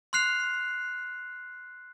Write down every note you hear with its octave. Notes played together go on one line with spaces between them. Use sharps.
C6 F6 F#6 C7 F7